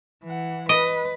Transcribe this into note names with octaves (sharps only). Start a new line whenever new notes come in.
E3 F#5
B4 D#5